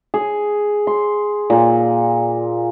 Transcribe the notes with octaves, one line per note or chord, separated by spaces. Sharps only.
G#4
C6
A#2